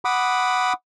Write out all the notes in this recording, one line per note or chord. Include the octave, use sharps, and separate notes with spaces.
F#5 B5 D6 D#6